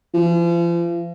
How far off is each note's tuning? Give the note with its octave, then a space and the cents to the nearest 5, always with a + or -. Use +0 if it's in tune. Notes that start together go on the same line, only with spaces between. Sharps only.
F3 -45